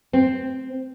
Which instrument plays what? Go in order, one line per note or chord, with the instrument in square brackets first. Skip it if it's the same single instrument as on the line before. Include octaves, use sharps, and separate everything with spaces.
[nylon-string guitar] C4